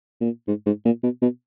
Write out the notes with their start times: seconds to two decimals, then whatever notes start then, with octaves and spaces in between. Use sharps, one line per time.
0.21 A#2
0.48 G#2
0.66 G#2
0.85 A#2
1.03 B2
1.22 B2